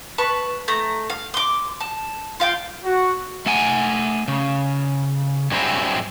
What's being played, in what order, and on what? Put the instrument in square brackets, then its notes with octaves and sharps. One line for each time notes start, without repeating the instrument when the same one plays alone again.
[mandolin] B4 A5 C#6
A3 A#5
F5
C6 D6
A5
F4 F5 G5
[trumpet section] F#4
[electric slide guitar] A3 F#5 G#5
C#3
G2 F#3 C4 E4 G4 G#4